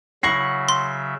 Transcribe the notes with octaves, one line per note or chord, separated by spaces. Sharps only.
C#3 F#3 E4 E5 F#5 C#6 A#6 C7
C6